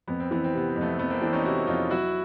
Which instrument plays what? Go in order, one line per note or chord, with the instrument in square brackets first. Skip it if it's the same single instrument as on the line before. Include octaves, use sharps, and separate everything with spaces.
[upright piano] F2 [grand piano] B3
[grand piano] C4
[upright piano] E3 [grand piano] B3
[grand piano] C4
[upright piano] C3 [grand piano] B3
[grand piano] C4
[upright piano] F2
[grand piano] A3 B3
[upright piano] F2 [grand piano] A3 B3
[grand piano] A#3 C4
[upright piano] E3 [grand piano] C4 D4
[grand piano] C#4 D#4
[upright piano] C3 [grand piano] E4 F#4
[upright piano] F2 [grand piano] D#4 F4
[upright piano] F#3 [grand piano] E4 F#4